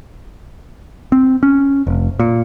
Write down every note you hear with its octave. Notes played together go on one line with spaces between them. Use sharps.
C4
C#4
F1
A#2